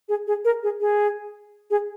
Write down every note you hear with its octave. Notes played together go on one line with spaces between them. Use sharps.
G#4
G#4
A#4
G#4
G#4
G#4